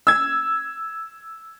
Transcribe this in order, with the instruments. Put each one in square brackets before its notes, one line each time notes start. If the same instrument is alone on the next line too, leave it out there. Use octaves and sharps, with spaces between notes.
[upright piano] E6 G#6